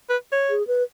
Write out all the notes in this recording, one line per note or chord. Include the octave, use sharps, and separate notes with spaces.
B4
C#5
G#4
B4